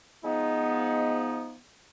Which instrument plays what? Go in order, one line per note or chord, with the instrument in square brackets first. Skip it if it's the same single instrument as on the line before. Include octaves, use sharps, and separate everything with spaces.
[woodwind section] F3 B3 [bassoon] G#3 [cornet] D#4